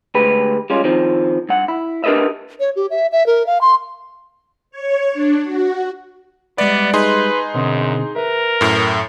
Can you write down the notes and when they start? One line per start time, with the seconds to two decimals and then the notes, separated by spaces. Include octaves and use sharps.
0.15 D2 G#3 G4 B4
0.70 G3 G#3 C#4 F4
0.84 D#3 F3 C4
1.49 G2 F#5
1.68 E4
2.04 D4 G4 A#4 B4 D#5 E5
2.60 C#5
2.76 G4
2.90 E5
3.12 E5
3.26 A#4
3.47 F5
3.61 C6
4.71 C#5
5.12 D4
5.44 F#4
6.58 G3 G#3 B3 D5 E5
6.94 D#4 G#4 B4 C6
7.54 F#2 B2 D3 C4
8.16 A#4 B4 E5
8.61 F#2 A2